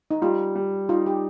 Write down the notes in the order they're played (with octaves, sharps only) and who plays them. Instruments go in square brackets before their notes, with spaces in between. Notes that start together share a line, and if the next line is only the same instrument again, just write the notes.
[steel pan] D#4
[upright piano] G3 [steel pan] F4
[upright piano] G3
[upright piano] D#4 [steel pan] F4
[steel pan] G4